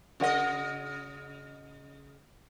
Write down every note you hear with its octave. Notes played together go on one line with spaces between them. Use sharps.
C#3 F#4 A#4 D#5 F#5